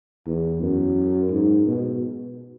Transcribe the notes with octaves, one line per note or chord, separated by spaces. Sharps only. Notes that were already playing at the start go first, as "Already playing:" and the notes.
E2
F#2
G#2
B2